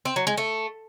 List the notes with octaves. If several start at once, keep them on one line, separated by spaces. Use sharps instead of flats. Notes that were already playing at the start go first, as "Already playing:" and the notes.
C4
F#3
G#3
A3